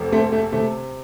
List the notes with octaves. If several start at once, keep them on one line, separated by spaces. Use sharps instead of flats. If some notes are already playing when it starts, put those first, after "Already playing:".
Already playing: F1 F2 C3
A3 C4
A3
C3 A3